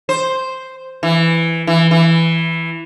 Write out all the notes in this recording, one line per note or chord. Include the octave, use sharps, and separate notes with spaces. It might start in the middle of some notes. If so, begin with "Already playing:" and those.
C5
E3
E3
E3